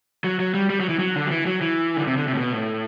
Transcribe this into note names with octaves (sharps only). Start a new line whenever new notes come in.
F#3
F#3
G3
G3
F#3
E3
F#3
D3
F#3
E3
F#3
E3
D3
C3
D3
C3
A2
B2
A2